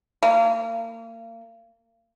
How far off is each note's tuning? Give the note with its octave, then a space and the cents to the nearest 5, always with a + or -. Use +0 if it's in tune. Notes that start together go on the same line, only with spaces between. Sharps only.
A#3 -35